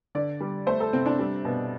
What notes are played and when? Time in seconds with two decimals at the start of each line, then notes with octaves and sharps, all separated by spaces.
0.15 D3 D5
0.41 G3
0.67 A3 C5
0.80 A4
0.93 C3 C4
1.06 D4
1.19 G3
1.45 B2